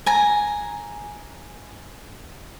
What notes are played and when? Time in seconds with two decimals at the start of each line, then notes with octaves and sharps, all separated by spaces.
0.06 G#5 A#5